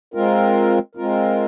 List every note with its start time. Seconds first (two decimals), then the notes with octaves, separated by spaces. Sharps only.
0.14 G#3 C4 F4 A#4
0.95 G#3 C4 F4 A#4